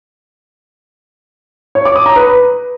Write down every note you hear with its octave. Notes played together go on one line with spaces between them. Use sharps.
C#5
D6
D#6
A#5
B4